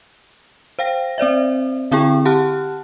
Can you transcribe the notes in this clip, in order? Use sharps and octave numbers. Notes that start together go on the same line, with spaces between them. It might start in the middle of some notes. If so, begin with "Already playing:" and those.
C5 F5 G5 A#6
C4 C5 D5 E5
D3 C4 E4 G#4 G5 C#6
G4 F#5 A5 F6 F#6